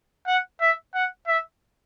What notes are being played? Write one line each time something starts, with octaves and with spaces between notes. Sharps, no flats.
F#5
E5
F#5
E5